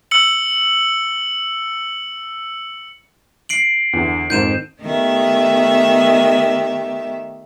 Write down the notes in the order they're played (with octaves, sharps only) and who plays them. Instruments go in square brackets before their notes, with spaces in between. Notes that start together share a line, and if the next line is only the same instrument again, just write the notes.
[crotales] E6 C#7 F#7
[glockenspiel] C7 D7 F#7
[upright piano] E2 D3
[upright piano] F2 G#2 D#3 [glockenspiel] G6 D#7 E7
[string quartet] D#3 A3 B3 G4 E5